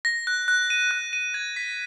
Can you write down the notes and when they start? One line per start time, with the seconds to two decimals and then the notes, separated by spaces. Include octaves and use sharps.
0.05 A#6
0.27 F#6
0.48 F#6
0.70 D#7
0.91 F#6
1.13 D#7
1.34 G#6
1.56 B6